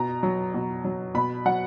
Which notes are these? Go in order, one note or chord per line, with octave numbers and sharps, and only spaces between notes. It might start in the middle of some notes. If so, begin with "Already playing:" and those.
Already playing: B2 A#5
F#3
B2
F#3
B2 B5
F#3 F#5